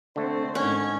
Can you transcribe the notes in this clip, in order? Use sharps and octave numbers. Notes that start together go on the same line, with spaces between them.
D3 A3 C4 C5
G#2 D3 D#3 C#4 G#6